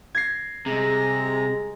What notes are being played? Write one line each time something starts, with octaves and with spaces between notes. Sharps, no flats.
G#6 A#6 C7
C3 G3 G#3 G#4 A#5